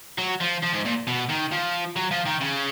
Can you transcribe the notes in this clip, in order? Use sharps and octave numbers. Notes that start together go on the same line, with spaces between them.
F#3
F3
F3
G#2
A#2
B2
D#3
F3
F#3
F3
D#3
C#3